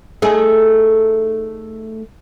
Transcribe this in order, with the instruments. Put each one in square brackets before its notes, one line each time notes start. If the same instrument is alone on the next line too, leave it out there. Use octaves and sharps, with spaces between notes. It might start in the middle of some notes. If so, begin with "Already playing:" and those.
[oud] A3 D#4 G#4